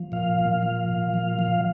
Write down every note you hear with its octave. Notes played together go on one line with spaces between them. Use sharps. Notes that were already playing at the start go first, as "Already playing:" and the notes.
Already playing: F3
A#2 F5
A#2
F3
A#2
F3
F3